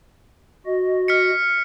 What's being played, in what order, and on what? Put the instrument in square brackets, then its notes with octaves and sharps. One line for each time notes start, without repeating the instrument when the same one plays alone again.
[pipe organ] F#4 D#5
[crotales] F6 B6 C#7